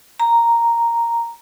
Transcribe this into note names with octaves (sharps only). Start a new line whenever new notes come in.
A#5